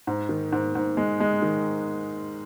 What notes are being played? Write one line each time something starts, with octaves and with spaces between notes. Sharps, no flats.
G#2
D#3
G#2
G#2
G#3
G#3
D#3